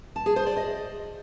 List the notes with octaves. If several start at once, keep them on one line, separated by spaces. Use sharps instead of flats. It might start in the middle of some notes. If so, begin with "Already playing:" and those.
A5
G#4
C5
D5
D#5